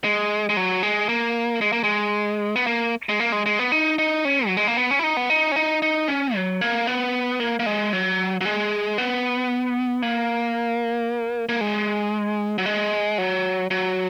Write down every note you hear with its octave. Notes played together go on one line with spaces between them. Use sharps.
G#3
G#3
F#3
G#3
A#3
G#3
A#3
G#3
B3
A#3
G#3
A#3
G#3
G#3
B3
D#4
D#4
C#4
F#3
G#3
A#3
B3
C#4
E4
D#4
B3
D#4
C#4
D#4
D#4
C#4
F#3
A#3
B3
A#3
A#3
G#3
F#3
F#3
G#3
B3
A#3
A#3
G#3
F#3
G#3
F#3
F#3